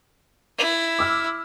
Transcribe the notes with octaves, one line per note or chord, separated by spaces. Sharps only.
E4
D6 E6 F6